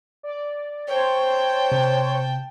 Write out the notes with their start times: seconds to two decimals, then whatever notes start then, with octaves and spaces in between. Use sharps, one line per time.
0.23 D5
0.88 C5 C#5 G5 A5
1.72 C3